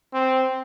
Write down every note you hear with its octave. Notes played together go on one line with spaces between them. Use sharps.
C4